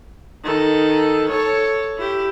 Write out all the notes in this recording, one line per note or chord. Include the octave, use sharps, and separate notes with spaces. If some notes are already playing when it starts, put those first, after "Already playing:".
D#3 A4
A4 C#5
E4 G4